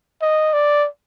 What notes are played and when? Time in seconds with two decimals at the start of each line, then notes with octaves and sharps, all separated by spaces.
0.22 D#5
0.53 D5